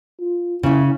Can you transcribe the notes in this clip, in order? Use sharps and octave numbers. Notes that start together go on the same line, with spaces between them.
F4
C#3 C#4 E4